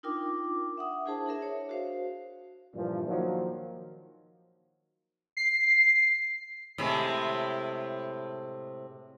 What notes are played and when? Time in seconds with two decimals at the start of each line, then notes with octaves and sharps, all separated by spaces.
0.03 D4 D#4 F4 A#4 G5 D6
0.78 E5 F#5 D#6
1.06 D4 E4 G#4 C5 A5
1.26 D4 G#4 A#4 E5
1.42 C#5
1.69 F#4 C5 F5
2.75 G2 A#2 E3 F3 D4
3.08 D#3 F3 F#3 A#3
5.37 C7
6.78 A2 C3 G#3